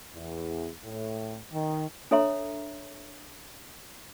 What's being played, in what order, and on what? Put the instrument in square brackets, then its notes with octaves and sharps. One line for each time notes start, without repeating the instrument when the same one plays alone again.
[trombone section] E2
A2
D#3
[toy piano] D4 A4 C#5 E5 A#5 C6